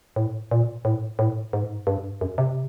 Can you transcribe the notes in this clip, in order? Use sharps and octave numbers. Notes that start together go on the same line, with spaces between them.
A2
A#2
A2
A2
G#2
G2
F#2
C3